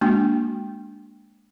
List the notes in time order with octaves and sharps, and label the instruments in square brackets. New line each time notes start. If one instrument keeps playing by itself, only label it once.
[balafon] G#3 A#3 D4 F#4 G5